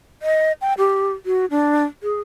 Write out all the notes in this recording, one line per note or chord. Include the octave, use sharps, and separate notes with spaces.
D#5
G5
G4
F#4
D4
G#4